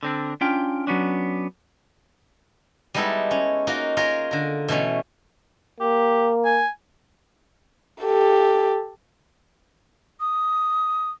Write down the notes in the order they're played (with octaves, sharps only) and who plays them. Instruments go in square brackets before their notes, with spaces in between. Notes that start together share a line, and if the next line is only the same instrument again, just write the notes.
[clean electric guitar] D3 C4 D4
C#4 D4 F4 G5
F#3 B3 C#4 D4
[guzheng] G3 G#3 B3 D#4 E4 A4
C#4
A#3 D#4 F4 F#4 A#4
F4 G#4 A#4 C#5
D3 A#4
B2 E3 A3 C#4
[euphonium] A#3 [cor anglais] G4
[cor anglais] G#5
[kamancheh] G4 A4
[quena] D#6